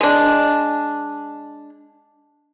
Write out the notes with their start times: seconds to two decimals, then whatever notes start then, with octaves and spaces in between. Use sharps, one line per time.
0.01 G#3 D4